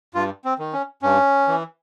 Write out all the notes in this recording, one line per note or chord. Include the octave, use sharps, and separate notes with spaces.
G2 F4
C4
D#3
C#4
G2 C#4
E3